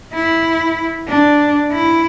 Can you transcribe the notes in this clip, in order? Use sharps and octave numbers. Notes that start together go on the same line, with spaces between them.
E4
D4
E4